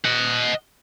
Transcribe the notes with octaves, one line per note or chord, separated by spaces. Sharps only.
D#5 F#5